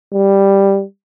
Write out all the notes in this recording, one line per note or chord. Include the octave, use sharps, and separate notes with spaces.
G3